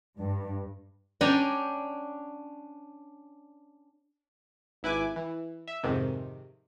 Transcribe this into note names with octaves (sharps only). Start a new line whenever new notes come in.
G2
C#4 D4 D5 G5 G#5 A#5
G#1 E4 B4 G#5 D6
E3
E5
F2 G#2 C3 D#3